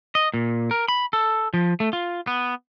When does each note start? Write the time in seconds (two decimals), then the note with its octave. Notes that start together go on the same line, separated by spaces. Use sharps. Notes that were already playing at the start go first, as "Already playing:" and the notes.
0.15 D#5
0.34 A#2
0.71 A#4
0.88 B5
1.13 A4
1.54 F3
1.80 A3
1.93 F4
2.27 B3